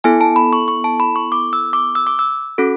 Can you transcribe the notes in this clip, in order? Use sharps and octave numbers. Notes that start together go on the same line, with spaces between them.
B3 E4 A4 G#5
A5
B5
C#6
C#6
A5
B5
C#6
D6
E6
D6
E6
D6
E6
C#4 F#4 A4